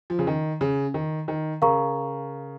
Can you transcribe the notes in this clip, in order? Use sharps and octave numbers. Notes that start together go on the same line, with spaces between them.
F3
C#3
D#3
C#3
D#3
D#3
C#3 A#4 F5 A#5 C#6